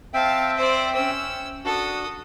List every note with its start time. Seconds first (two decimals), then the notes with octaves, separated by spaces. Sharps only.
0.14 C4 E5 F5 G5 A5
0.56 C5 D5
0.95 C#4 E6
1.65 D4 F#4 A4 D#6